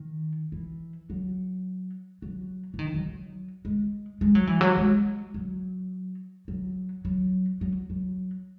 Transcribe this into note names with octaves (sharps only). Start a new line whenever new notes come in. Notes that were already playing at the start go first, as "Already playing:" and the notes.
Already playing: D#3
E3
F#3
F#3
E3
D#3
F#3
F#3
G#3
G#3
F#3
E3
F#3
G#3
F#3
F#3
F#3
F#3
F#3